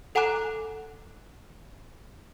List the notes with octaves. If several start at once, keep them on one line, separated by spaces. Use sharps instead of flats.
A4 F#5 G#5 A#5 D6 F#6